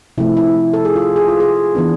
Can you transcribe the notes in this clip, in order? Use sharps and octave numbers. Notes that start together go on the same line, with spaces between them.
C3 F3 A3 C4 E4
E4
A4
G#4
F4
G#4
F4
G#4
E3 B3 D4